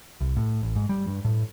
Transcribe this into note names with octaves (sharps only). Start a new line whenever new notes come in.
C2
A2
A1
G#2
G3
G2
A2